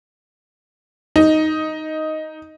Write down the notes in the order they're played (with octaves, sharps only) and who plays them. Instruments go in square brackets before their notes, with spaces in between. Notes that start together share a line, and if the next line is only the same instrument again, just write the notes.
[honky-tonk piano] D#4